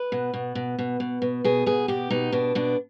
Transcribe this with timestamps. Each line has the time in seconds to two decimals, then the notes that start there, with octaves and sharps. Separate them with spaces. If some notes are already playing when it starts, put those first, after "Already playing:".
Already playing: B4
0.12 B2
0.34 B2
0.55 B2
0.78 B2
1.00 B2
1.22 B2
1.44 B2 G#4
1.66 B2 G#4
1.88 B2 G4
2.10 B2 D#4
2.32 B2 D4
2.55 B2 D4